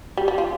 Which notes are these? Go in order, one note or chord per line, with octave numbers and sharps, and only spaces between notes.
G3
G3
F4